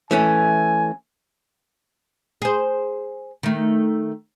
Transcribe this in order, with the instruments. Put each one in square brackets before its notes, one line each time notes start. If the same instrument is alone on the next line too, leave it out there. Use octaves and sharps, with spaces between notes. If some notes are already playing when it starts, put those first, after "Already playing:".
[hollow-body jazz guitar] E3 A3 C#4 [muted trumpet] G#5
[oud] G#4 C5
D#3 A3